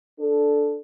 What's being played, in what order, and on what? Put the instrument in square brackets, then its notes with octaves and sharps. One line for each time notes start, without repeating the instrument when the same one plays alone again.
[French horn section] D4 A4